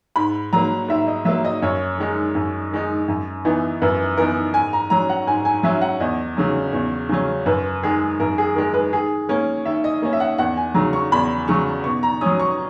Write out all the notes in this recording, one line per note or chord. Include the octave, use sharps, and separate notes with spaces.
G#2 B5
F#3 A#3 A#5
G#2 E5
D#5
F#3 A#3 E5
D#5
F#2 C#5
D#3 G#3 D#4
F#2
D#3 G#3 D#4
F#2
E3 B3 D#4
F#2 B4
E3 B3 D#4 A#4
G#2 G#5
A#5
F#3 C#4 A#5
F#5
G#2 G#5
G#5
F#3 C#4 E5
F#5
E2 D#5
C#3 F#3 C#4
E2
C#3 F#3 C#4
F#2 B4
D#3 G#3 G#4
F#2 A#4
G#4
D#3 G#3 A#4
B4
D#3 G#4
A#3 C#4 A#4
D#3 E5
D#5
A#3 C#4
E5
F#5
E2 F#5
G#5
C#3 F#3 A#5
C#6
E2 B5
C#3 F#3 C#6
B2 C#6
A#5
F#3 C#4 D#6
C#6